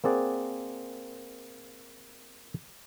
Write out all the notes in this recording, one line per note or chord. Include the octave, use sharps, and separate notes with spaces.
A#3 C4 G#4 D5 F#5